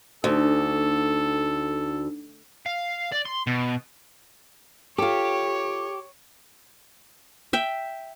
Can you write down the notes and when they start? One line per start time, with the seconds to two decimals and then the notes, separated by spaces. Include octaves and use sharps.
0.24 D2 D4 D#4 A4
2.66 F5
3.12 D5
3.25 C6
3.47 B2
4.98 F4 G4 A4 C#5
7.53 E5 G5